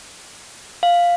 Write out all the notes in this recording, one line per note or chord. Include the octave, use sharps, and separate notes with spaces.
F5